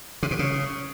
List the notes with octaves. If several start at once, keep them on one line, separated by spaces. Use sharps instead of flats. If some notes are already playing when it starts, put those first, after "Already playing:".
C3
B2
C#3